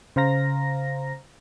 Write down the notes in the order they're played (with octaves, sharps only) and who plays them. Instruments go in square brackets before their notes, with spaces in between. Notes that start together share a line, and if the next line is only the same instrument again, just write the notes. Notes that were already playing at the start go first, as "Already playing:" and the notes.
[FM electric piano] C#3 C5 F5 A#5 A#6